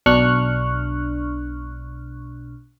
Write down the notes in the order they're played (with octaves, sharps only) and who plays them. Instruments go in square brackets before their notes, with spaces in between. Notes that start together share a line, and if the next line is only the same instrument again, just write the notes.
[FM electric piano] B1 B2 D4 C#6 F6 F#6